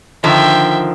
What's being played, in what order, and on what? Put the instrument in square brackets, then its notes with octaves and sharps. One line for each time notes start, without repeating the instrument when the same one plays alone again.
[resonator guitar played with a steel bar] D3 D#3 F3 [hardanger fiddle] E5 G5